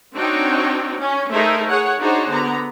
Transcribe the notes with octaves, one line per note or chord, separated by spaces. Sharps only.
C4 D4 D#4 F#4 C#5 G5
C#4
A3 D#4 G#4 A#4 C5 E5
G#4 C#5 F#5
D4 D#4 F#4 G#4 C5 C#5
D3 B3 A#5